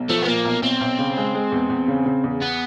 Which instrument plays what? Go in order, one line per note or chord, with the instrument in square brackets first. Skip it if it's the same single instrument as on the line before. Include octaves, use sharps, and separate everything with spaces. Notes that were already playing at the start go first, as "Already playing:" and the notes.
Already playing: [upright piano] B1
[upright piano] F3 [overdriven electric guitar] A3
[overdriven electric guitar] B3
[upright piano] A#2 [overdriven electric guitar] A#3
[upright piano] B1
[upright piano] B1 [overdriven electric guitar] C4
[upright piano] B1
C#3
G#3
G#3
E2
E2
C#3
C#3
E2
[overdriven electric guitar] B3